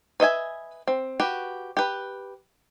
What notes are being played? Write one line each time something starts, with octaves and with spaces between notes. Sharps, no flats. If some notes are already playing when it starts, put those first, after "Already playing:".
B4 D#5 E5 G#5
C4
F#4 G4 B4
G4 B4